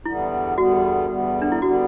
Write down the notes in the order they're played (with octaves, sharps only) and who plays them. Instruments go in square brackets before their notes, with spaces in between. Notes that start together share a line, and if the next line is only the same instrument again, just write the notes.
[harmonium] E2 D3 G3 B3 [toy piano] E4
[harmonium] E2 D3 G3 B3 [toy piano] F#4
[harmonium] E2 D3 G3 B3
[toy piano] D4
E4
[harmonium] D3 G3 B3 [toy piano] F#4